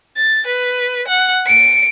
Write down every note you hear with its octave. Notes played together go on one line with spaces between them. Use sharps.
A6
B4
F#5
C#7 D7